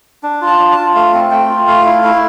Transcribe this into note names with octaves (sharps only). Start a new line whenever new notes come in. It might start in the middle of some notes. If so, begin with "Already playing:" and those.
D4
F4
A5
D4
A5
F4
A3 F5
C4
A3 G5
F4
A3 F5
E4
E4